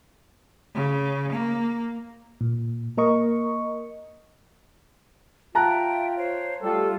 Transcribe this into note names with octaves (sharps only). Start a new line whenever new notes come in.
C#3
A#3
A#2
A#3 A#4 D#5 C#6
F4 E5 G5 A5 A#5 F#6
C5 C#5
G3 A3 F4 G4 A4